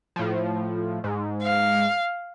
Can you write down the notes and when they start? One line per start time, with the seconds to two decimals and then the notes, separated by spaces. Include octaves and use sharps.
0.16 A2 F3
1.04 G#2
1.42 F5